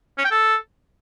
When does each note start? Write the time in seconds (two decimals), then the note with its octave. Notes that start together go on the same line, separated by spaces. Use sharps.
0.18 C#4
0.25 G5
0.31 A4